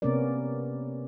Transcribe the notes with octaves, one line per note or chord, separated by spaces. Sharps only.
C3 A#3 B3 C#4 A#4 D5